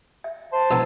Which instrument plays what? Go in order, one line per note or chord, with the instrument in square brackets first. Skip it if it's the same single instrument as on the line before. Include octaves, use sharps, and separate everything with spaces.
[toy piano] E5
[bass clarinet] C5 [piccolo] A5
[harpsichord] A#1 B3 G#5 [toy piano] E4 A#5 E6